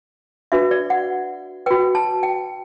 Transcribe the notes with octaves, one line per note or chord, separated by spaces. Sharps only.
D4 F#4 B4 E5
D5
F#5
F#4 B4 G5
A5
G5